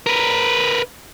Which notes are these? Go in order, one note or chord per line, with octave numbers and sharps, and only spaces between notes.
A#4 B4